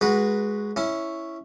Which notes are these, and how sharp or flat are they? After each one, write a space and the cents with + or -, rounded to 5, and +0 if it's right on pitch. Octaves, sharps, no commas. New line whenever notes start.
G#3 +0 F#4 +0 B4 -15
C#4 +0 E4 +0